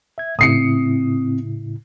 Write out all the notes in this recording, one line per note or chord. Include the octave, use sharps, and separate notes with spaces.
E5 G#6
A2 C#3 C4 E4 D#6 C7 C#7